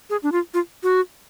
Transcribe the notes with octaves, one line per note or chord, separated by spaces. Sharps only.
G#4
D4
F4
F4
F#4